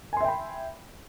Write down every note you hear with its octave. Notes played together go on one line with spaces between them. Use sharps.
E5 G5 G#5 B5 C6